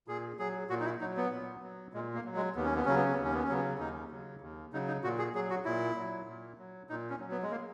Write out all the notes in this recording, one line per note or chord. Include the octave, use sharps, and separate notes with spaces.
A#2 G#4
F#3 G#4
A#2 F#4
D#4
E4
F#3 D#4
B3
A#2
F#3
A#2 G#3
A#3
F#3
G#3
D#2 B3
C#4
B3
C#3 F#3 C#4
B3
C#4
D#2 B3
C#4
B3
C#4
C#3 F#3 B3
D#2 D#4
C#3 F#3
D#2
C#3 F#3 D#4
D#4
A#2 F#4
G#4
F#3 G#4
F#4
A#2 E4
F#3
A#2
F#3
A#2 D#4
C#4
F#3
B3
G#3
A#3